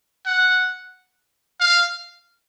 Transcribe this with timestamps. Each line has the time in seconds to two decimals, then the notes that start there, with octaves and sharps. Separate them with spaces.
0.26 F#5
1.60 F5